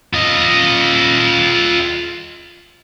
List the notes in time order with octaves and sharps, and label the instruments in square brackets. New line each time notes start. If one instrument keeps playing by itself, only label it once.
[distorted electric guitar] F4 D#5